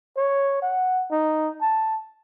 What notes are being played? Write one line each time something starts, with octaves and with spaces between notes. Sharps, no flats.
C#5
F#5
D#4
A5